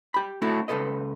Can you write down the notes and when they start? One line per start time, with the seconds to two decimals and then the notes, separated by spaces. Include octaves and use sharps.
0.14 G4 B5
0.42 A3 D4 E4 F#4 A4
0.68 C#2 C#3 A4 B4 D#5